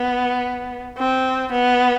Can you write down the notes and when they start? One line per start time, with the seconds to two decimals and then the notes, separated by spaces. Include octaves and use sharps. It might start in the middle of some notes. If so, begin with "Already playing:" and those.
Already playing: B3
0.98 C4
1.53 B3